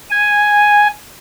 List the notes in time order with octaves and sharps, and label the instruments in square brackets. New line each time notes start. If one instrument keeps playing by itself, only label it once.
[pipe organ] G#5